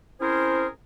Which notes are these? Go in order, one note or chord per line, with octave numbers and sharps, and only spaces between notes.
C4 C#4 E4 G#4 A#4 C5